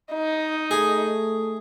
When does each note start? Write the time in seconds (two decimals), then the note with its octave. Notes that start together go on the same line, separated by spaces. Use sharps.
0.13 D#4
0.71 A3 G#4